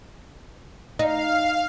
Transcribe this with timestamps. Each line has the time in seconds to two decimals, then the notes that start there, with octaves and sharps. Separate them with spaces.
0.99 D#4 F5